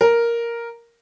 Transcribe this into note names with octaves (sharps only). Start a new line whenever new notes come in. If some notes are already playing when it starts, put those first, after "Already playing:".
A#4